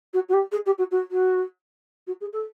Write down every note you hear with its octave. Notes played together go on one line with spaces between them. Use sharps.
F#4
F#4
G4
G#4
G4
F#4
F#4
F#4
F#4
G#4
A4